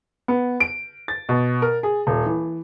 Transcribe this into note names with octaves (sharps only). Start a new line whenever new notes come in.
B3
D7
A6
B2
A#4
G#4
D#1
E3